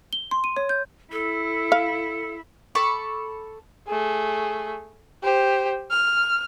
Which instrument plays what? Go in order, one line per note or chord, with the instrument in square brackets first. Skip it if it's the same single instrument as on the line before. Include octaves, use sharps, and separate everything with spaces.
[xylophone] G7
C6
D#7
C#5
G6
[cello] E4 [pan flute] A4
[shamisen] F5
[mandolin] A4 B5 C#6 D6
[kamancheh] A3 G#4
G4 C5
F6